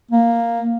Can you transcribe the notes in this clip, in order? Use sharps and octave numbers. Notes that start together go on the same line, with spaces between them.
A#3